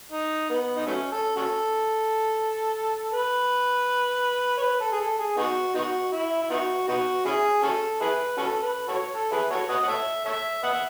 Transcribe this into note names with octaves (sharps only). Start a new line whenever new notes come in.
D#4
B3
D#4
F#3 A3 C#4
A4
C#4 F#4 A4
B4
C#5
B4
A4
G#4
A4
G#4
B3 D#4 F#4
B3 D#4 F#4
E4
E4
B3 D#4 F#4
B3 D#4 F#4
C#4 E4 G#4
C#4 F#4 A4
E4 G#4 B4
C#4 F#4 A4
B4
F#4 A4 C#5
A4
E4 G#4 B4
F#4 A4 C#5
F#4 B4 D#5
F#5
A4 C#5 E5
A4 C#5 E5
B4 D#5 F#5
E5